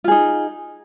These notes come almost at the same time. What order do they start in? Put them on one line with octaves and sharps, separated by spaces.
F4 G#4 D#4